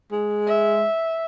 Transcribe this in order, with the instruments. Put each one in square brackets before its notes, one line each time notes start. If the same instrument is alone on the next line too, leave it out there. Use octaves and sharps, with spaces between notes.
[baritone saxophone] G#3
[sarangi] E5